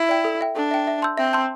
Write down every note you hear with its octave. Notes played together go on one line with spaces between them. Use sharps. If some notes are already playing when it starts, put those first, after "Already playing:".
Already playing: E4
D5 G5
A4
E5 G5
D4 A4
E5 G5
E5
A5 C6 E6 G6
C4 E5
A5 C6 E6 G6